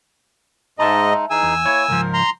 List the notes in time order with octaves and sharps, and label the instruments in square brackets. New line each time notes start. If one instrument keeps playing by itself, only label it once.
[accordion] G#2 D#5 [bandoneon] G#3 D#4 [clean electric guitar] E5 A5
[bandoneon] E3 D#4 G#4 [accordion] G#5 E6
[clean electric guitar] E2
[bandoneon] A#3 E4 [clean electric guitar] C#5
[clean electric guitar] C#2 G#2 F3 [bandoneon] A#4
[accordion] A#5 C6